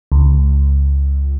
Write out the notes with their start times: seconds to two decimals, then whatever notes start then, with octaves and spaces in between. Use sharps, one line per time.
0.12 C#2